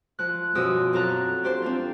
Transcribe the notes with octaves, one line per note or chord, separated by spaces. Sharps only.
F3 F#6
F#2 B2 F3 G4 D#6 E6
F2 F#3 A4 A#5 F#6
D4 G4 C5
C4 D4 F4